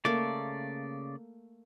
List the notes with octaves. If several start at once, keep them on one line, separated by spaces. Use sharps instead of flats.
C#3 A3 A#3 D5